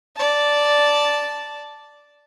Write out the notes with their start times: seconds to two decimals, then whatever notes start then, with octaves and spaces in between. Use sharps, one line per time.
0.16 D5 A5